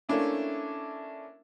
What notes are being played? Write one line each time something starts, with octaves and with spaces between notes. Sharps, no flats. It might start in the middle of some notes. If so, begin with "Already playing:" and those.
A3 A#3 C#4 D4 E4